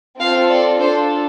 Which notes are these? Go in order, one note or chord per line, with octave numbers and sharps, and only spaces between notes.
C4 F4 A4 F5
D5
D4 F4 A4 C5